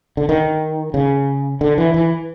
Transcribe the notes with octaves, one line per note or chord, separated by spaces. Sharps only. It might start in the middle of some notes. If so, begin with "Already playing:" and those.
D3
D#3
C#3
D3
E3
E3